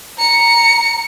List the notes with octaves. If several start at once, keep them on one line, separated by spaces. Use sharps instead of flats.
A#5 C#7